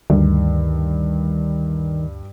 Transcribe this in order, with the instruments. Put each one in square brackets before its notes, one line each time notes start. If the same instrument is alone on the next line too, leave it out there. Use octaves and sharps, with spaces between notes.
[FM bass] D2 [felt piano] G2 [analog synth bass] D#3